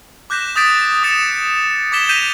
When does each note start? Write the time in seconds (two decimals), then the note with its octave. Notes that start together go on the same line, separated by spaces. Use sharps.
0.30 D6 F#6 G6 A#6 B6 E7
0.55 D6 D#6 G6 A6 B6 D7
1.03 D#6 A6 C#7 E7
1.92 D6 G#6 B6 E7 G7
2.09 G6 G#6 A#6 B6 D#7 F7